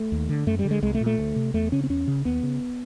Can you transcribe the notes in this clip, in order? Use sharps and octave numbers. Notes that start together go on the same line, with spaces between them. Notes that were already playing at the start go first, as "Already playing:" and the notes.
Already playing: A3
D#2
D3
F#2 A3
G3
D3
G#3
C2 G#3
A3
A#2
A3
D2
C3
E2 A3
C#3 C#4
C4
E2 C#4
C#3
D#2 B3
C#3